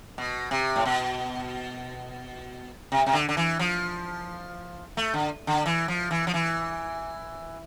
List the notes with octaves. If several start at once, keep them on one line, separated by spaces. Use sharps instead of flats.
B2
C3
A2
B2
C3
C3
D3
D3
E3
F3
A3
D3
D3
E3
F3
E3
F3
E3